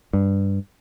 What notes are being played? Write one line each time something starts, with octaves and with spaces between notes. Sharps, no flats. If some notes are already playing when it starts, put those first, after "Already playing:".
G2